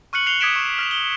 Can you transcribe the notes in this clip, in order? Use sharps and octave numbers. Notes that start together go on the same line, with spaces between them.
C#6 F6 F#6 C#7 F#7
F#6 C7 C#7 F7 G7
D6 D#6 G#6 B6 D7 E7
C#6
F6 B6 F7
G7